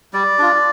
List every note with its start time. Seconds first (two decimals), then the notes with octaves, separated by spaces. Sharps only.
0.13 G3 D5
0.39 D4 F4